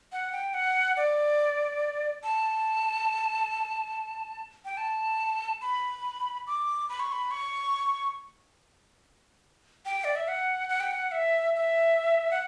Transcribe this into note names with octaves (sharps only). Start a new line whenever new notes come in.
F#5
G5
F#5
D5
A5
G5
A5
B5
D6
B5
C#6
B5
C#6
G5
D5
E5
F#5
F#5
G5
F#5
E5
E5
F#5